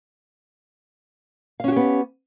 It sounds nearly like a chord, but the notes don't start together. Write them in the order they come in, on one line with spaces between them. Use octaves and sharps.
F5 C#4 F#4 G4 B3